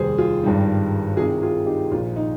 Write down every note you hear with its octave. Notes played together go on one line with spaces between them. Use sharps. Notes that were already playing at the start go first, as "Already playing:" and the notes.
Already playing: F1 D#2 D#3 G3 G#4 C5
F4 G#4
G#1 G2 D#3 G3
C2 C3 D#3 F4 G#4
F4 G#4
D#4 G4
A#1 A#2 F3 F4
D#4